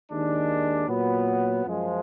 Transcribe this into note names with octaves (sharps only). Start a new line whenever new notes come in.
D#2 D#3 G#3 D4
A#2 F#3 B3
F#2 F3 G#3